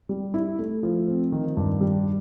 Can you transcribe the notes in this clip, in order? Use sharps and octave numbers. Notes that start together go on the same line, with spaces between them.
G3
E4
A3
F3
C4
D#3
G2
G3